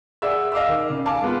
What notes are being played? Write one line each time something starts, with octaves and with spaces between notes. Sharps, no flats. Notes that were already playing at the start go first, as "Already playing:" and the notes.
G#4 D5 E5 F#5 E6
D#5 F5 D6 E6
D#3
C#3
F5 G#5 A5 D6
G#3 B3 F4